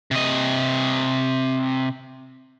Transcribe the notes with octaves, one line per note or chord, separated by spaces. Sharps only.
C3 D#5